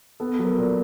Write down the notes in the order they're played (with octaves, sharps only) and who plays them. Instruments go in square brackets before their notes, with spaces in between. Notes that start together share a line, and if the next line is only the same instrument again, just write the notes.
[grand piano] B3 A4
F#3
A#4
A#2